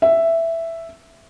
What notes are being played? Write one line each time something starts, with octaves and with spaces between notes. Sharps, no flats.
E5